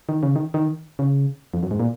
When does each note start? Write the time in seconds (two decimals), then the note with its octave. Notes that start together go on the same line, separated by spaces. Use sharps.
0.09 D#3
0.23 C#3
0.36 D#3
0.54 D#3
0.99 C#3
1.54 F2
1.63 F#2
1.71 G#2
1.80 A#2